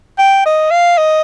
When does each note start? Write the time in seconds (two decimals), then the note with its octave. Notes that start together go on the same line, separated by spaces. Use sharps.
0.19 G5
0.46 D#5
0.71 F5
0.98 D#5